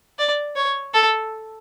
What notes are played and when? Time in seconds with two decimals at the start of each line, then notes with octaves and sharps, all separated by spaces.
0.19 D5
0.56 C#5
0.94 A4